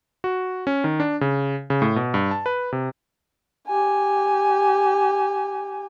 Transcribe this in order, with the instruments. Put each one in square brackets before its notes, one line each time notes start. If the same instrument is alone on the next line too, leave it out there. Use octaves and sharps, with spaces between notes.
[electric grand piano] F#4
C#4
D#3
D4
C#3
C#3
A2
B2
G2
A5
B4
C3
[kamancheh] G4 G#5